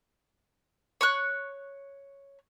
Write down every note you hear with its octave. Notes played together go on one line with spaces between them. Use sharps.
C#5 C#6 F#6